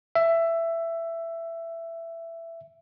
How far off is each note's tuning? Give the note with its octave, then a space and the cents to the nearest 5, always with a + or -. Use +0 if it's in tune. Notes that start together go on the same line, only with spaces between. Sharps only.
E5 +15